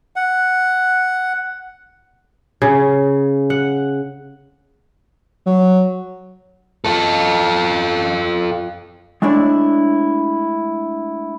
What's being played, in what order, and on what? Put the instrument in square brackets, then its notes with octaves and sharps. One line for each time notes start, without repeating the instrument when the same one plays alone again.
[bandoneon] F#5
[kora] C#3
F#5
[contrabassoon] F#3
[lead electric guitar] F4 A4
[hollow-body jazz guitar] G#3 A3 D4 E4 C#5 D5